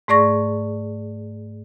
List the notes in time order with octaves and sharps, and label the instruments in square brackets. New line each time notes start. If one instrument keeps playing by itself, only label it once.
[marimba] G#2 A3 G#4 D5 C#6 A#6